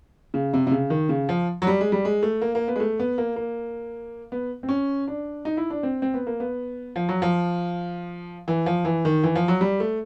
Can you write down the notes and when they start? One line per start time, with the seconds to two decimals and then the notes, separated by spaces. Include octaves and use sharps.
0.34 C#3
0.54 C3
0.67 C3
0.71 C#3
0.90 D#3
1.09 C#3
1.29 F3
1.62 F#3
1.67 G3
1.81 G#3
1.92 G3
2.05 G#3
2.23 A3
2.42 A#3
2.55 A#3
2.68 B3
2.76 G#3
2.80 A3
2.99 B3
3.18 A#3
3.36 A#3
4.32 B3
4.63 C4
4.69 C#4
5.08 D4
5.45 D#4
5.57 E4
5.70 D4
5.83 C4
6.02 C4
6.14 B3
6.27 A#3
6.40 B3
6.96 F3
7.09 F#3
7.22 F3
8.48 E3
8.66 F3
8.85 E3
9.05 D#3
9.24 E3
9.36 F3
9.48 F#3
9.61 G3
9.80 A3